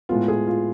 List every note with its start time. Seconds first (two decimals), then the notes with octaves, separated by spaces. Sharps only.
0.09 A2 G#3 B3 F4
0.28 G#4
0.47 F4